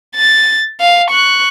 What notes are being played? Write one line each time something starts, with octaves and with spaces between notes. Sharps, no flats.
A6
F5
C#6 F#6